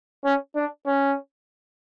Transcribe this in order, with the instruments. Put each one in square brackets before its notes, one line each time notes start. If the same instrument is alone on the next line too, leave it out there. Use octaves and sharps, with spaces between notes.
[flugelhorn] C#4
D4
C#4